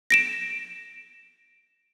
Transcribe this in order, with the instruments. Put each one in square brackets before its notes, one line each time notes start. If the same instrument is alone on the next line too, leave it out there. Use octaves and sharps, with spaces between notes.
[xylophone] A#6 D7 E7